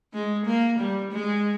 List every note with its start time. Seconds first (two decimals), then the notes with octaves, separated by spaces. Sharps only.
0.14 G#3
0.46 A#3
0.79 G3
1.12 G#3